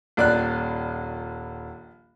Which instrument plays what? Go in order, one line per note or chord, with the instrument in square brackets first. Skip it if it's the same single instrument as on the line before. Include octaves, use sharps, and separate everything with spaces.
[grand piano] D#1 [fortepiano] A#1 D5 F#6